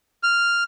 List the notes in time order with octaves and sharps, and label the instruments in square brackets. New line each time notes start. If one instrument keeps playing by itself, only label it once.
[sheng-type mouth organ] F6